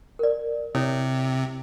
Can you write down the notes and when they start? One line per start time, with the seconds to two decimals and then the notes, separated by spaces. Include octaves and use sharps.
0.19 A#4 D5
0.75 C3 E4 C#5 D#6